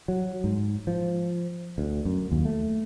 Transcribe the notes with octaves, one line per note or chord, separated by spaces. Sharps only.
F#3
G#2
F3
D2
F#2
D#2
A3